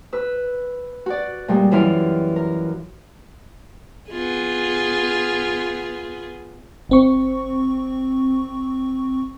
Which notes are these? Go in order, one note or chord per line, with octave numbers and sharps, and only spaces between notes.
B4 E6
F#4 D5
A#2 G3 G#3
F#2 E3 E4 F4 F6
A#4
B3 F4 G#4
G1 C4 C#6